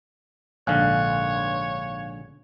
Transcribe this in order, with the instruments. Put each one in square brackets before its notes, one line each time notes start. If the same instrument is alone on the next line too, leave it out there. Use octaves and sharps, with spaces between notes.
[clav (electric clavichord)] A#1 G#2 D3 [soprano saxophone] C#5 [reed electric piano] F5 G#5 F#6